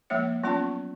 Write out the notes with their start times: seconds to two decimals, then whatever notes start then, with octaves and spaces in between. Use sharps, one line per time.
0.10 F3 G#3 A#3 C#5 E5
0.44 F#3 B3 C#4 F4 A5 C#6